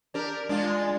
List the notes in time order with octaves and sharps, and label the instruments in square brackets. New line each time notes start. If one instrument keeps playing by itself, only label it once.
[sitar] D4 G4 A#4
[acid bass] G#3 [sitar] D4 F4